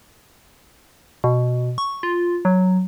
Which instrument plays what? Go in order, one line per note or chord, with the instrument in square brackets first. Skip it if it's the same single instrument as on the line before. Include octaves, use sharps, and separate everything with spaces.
[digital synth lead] B2
C#6
F4
F#3